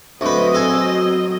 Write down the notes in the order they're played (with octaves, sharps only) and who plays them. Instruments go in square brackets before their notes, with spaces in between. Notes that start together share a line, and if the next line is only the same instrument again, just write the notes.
[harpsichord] D2 B4 [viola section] F#3 C4 D#5
[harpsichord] A4 G#5